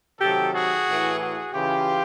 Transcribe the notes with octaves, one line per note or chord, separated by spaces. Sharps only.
C3 D#3 F#3 G4 A4
F#4 G#4
A2 E3
F#4 G#4
C#3 E3 F4 G4